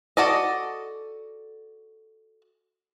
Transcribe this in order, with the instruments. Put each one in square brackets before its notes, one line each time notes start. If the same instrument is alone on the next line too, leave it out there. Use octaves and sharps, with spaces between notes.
[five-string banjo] F#4 A4 D5 D#5